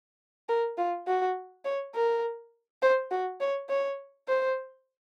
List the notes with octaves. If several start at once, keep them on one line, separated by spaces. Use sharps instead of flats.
A#4
F4
F#4
C#5
A#4
C5
F#4
C#5
C#5
C5